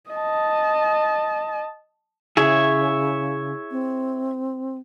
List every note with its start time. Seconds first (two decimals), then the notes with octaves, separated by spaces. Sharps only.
0.10 D#5 A5
2.37 C#3 E4 G#4 C#5 E5
3.71 C4